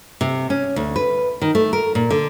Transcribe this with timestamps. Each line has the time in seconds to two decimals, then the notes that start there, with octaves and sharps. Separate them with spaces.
0.21 C3
0.50 C#4
0.76 D2
0.96 B4
1.42 D#3
1.55 A3
1.73 A#4
1.95 A#2
2.10 D3